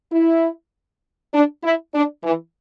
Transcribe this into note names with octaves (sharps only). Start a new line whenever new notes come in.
E4
D4
E4
D4
E3